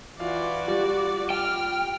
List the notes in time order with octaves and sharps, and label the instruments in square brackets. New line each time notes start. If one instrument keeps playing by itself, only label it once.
[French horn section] E3 F4 [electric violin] F#4 D5 [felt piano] F5
[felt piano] G3 [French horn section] F4
[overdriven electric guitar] G5 [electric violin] F6